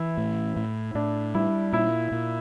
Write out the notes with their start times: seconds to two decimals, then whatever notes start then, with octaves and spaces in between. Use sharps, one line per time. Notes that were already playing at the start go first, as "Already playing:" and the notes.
Already playing: E3 E4
0.17 A2
0.57 A2
0.95 A2 D4
1.35 G3 E4
1.73 A#2 E4
2.12 A#2